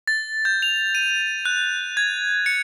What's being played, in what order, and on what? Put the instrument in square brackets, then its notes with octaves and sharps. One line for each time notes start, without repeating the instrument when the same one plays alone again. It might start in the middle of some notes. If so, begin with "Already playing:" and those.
[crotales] A6
G6
F7
D#7
F#6
G#6
C#7